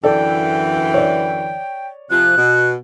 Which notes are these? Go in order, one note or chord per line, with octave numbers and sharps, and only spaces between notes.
F#2 D3 E3 A4 D5 G5
C#5 D5
C3 F3 F#6
B2